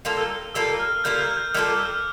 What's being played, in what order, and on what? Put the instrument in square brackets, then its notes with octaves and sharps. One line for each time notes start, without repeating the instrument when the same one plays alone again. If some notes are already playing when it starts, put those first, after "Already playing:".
[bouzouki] G3 A#3 F4 A4
[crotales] E6
E6
[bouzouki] G3 A#3 F4 A4 [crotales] E6
[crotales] F6
[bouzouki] G3 A#3 F4 A4 [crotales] G6
[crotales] F6
G6
[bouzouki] G3 A#3 F4 A4 [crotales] E6
[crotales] D6
E6
F6
E6